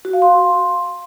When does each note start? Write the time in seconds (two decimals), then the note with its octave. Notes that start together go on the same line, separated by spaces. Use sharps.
0.05 F#4
0.13 F5
0.22 C6